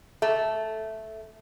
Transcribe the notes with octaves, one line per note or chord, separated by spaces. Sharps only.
A3